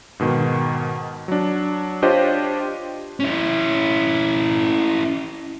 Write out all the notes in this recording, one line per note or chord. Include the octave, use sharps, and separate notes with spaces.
G#2 B2 D#3
F#3 D4
D4 F4 G4 C5 C#5 D#5
C#4 E4